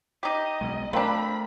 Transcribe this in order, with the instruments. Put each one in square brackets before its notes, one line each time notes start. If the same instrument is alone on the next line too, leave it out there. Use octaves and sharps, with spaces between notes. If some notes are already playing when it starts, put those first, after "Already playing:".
[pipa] D#4 G4 [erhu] D#5
[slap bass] B1 B2 G#3
[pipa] F3 D4 [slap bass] A3 [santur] C4 A#4 [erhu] B5